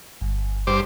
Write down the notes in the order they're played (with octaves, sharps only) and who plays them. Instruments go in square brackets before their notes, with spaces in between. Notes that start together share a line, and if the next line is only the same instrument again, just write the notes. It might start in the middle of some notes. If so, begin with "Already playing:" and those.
[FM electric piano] G1
[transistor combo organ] G2 C5 D6